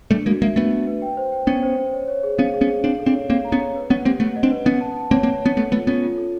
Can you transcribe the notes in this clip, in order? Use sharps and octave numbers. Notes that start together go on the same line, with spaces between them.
G3 A3 D4
G#3 A#3 F#4
G#3 A#3 E5
A3 B3 D4
F#4
B4
G5
C5
G5
B3 C#4 G5
C5
C5
C#5
C#5
G#4
B3 C#4 F5
G#4
B3 C#4
G#4
C4 D4 F5
A4
C4 D4
C#5
A#3 C4 F5
A#5
B3 C#4
C#5
B4
B3 C#4 F#5
A#3 C4 G4
A3 B3 F#5
D#5
C4 D4
B4
B3 C#4 F#5
A5
A5
A#3 C4 C#5
A#3 C4 C#5
B3 C#4 C#5
A3 B3 A4
A3 B3 F4
B3 C#4 F4
F4
A4